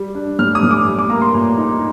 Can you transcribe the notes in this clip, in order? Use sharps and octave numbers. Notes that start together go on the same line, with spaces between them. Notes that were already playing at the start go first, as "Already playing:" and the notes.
Already playing: G3
D4
A2 F6
D#6
A2
D6
G3
D6
A#3 A#5
C6
A#2
D#4